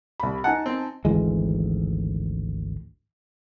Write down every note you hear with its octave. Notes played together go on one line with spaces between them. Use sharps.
C2 B5
D#4 F#5 G#5 A5
C4
G#1 D2 E3 G#3